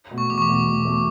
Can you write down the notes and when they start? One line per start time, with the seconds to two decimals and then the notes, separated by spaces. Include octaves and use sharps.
0.11 B2 A3
0.18 C#6
0.30 E2 D6
0.38 C#6
0.42 D6
0.49 B2 A3
0.54 C#6
0.67 E2
0.85 B2 A3